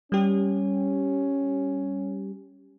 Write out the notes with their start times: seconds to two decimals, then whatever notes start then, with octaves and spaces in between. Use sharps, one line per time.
0.12 G3 C#4 G4